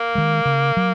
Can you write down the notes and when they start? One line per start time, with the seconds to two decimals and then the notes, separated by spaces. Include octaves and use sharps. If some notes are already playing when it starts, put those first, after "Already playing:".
Already playing: A#3
0.15 D#3 G#3
0.45 C#3
0.77 F#3